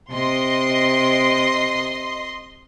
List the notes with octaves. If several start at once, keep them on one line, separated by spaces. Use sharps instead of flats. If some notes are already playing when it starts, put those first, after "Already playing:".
C3 D#5 C6